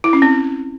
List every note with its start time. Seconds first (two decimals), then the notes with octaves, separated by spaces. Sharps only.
0.04 E4
0.13 C#4
0.22 C4